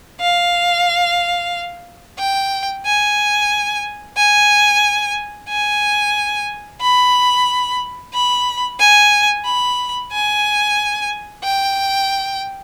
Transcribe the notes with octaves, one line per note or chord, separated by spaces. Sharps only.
F5
G5
G#5
G#5
G#5
B5
B5
G#5
B5
G#5
G5